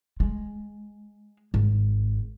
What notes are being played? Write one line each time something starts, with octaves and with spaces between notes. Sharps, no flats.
G#3
G#1